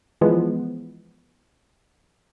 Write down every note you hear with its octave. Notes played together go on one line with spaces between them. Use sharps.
E3 F3 G#3 B3